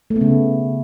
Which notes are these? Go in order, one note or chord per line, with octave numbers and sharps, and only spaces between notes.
A3
B3
C#3